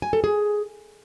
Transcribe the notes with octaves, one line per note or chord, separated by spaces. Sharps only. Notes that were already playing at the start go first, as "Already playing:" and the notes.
G#5
A4
G#4